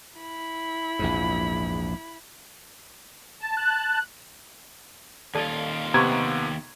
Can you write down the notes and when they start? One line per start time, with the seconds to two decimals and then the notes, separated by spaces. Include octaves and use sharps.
0.17 E4 B5
0.99 A#1 E2 G#2
3.41 A5
3.57 F#6
5.35 D#2 F4 A4 D5 A5
5.94 C3 B3 A#5 C6 C#6 G#6